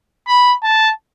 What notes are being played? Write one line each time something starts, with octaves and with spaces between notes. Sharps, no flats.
B5
A5